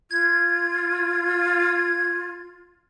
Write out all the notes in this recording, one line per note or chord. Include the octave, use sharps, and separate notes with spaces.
F4 G#6